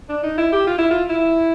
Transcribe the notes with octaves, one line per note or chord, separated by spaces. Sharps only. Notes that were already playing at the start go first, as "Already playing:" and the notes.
D4
D#4
E4
G4
F4
E4
F4
E4